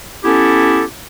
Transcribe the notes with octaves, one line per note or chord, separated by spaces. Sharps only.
B3 C#4 E4 G4 A4